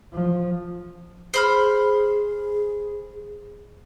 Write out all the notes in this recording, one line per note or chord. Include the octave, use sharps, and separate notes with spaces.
F3
G#4 C5 B5 F6